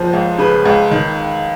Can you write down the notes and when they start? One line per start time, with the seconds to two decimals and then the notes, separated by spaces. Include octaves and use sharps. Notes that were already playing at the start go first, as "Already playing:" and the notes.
Already playing: F#1 F3 C5
0.13 C#2
0.38 C#3 B4
0.65 C#2
0.91 D#3